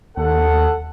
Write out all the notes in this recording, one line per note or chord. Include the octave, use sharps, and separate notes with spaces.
D#2 A4 F#5